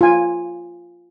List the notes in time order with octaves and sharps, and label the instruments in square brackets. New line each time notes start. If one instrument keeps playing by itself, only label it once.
[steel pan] F4 G#5